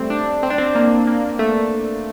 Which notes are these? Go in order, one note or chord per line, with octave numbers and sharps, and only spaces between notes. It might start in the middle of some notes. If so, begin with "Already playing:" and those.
Already playing: G3 A3 C4
D4
C4
D4
C4
A#3
A#3
A3